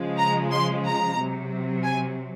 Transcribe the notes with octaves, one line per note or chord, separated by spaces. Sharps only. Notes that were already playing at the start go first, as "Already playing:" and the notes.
Already playing: C#3 F3 G#3
A#5
C6
A#5
C3 F#3
G#5